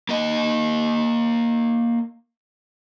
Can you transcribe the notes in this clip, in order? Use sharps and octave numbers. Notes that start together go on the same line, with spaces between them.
A#3 D#5